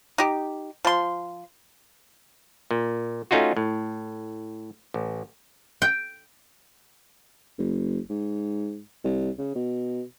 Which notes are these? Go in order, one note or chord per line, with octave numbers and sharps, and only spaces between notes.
D#4 G4
F3 C6
A#2
A3 C#4 D#4 F4 F#4
A2
A1
G5
F#1
G#2
C2
C#3
B2